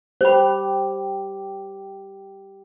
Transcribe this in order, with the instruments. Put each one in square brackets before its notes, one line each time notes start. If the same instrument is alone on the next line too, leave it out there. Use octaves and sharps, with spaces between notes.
[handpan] G4 [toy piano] C5 B5